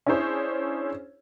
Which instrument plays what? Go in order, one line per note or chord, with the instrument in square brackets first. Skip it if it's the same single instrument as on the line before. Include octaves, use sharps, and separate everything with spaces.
[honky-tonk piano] C#4 D4 E4 G#4 C5 C#5